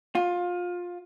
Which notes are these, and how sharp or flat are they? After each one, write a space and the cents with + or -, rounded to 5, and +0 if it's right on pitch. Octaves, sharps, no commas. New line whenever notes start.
F4 +20